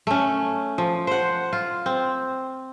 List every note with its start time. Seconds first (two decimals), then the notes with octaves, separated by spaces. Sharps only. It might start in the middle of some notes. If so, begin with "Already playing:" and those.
0.07 A3 C#4
0.78 F3
1.07 C5 F#5
1.53 F4
1.86 C4